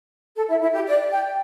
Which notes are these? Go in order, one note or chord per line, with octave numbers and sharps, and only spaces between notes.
A4
E4
E4
G4
D5
G5